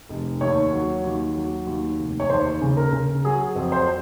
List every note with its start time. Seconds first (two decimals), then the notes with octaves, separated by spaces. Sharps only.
0.09 F1
0.41 D#2 C#5
0.73 F#3
1.04 D#2
1.36 F#3
1.67 D#2
1.98 F1
2.20 C#5
2.30 D#2 C5
2.61 C#3
2.77 A#4
2.93 C#3
3.24 F#3 G#4
3.55 F2
3.72 C5